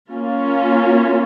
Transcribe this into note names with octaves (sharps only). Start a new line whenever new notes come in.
A#3 C#4 F4